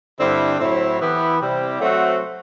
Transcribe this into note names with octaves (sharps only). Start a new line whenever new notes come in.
G2 D3 G3 C4 E4
A2 F#3 C4 E4
E3 B3 E4 G4 B4
C3 G3 C4 E4 G4
F#3 A3 C4 F#4 C5